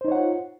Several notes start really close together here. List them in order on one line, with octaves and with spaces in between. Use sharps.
C5 D#4 C#5 F#5 F4